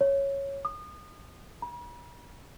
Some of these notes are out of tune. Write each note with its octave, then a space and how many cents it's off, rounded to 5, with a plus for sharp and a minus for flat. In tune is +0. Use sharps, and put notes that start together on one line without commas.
C#5 -5
D#6 -30
B5 -45